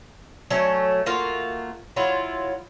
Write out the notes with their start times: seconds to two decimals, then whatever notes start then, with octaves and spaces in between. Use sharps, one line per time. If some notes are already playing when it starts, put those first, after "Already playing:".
0.50 F#3 A3 C#4
1.06 A3 A#3 F4 F#4
1.96 F#3 E4 F4